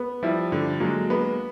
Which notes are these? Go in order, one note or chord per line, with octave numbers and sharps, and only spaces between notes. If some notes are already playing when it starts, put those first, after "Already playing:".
Already playing: B3
F3 G3 E4
D3
F#3 G#3 A#3
B3